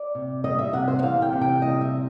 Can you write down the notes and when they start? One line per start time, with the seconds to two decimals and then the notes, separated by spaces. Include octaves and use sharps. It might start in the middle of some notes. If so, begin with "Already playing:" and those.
Already playing: D5
0.15 C3
0.44 G3 D#5
0.59 E5
0.73 C3 F#5
0.88 C5
1.02 E3 F5
1.22 G5
1.32 C3
1.41 G5
1.62 G3 D#5
1.81 E5